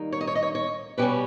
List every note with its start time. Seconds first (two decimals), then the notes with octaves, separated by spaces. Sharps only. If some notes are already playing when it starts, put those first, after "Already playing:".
Already playing: D#3 G3 A#3 D#4
0.12 C#5
0.21 D#5
0.27 C#5
0.35 D#5
0.43 C#5
0.55 C#5
0.98 B2 G3 C#4 B4